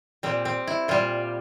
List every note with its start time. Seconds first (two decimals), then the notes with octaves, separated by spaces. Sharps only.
0.23 A#2 G3 C4
0.45 C4
0.67 E4
0.88 A#2 G3 F4